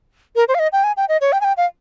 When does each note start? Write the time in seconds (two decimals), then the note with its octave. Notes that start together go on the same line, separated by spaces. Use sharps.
0.36 A#4
0.48 C5
0.54 F5
0.59 D#5
0.72 G5
0.84 G#5
0.97 G5
1.09 D#5
1.21 C#5
1.32 G5
1.41 G#5
1.44 G5
1.57 F5